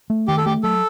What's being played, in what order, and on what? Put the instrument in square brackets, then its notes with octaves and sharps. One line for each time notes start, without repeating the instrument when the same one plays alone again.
[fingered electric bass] A3
[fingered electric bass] D#3 [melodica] G4
[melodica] A4
[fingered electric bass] A3 [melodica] G4
[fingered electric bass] F#3 [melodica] A4